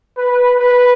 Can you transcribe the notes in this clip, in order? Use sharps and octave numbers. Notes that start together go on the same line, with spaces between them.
B4
B4